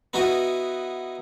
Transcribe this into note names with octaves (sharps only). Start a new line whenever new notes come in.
B3 D#4 E4 F#4 B4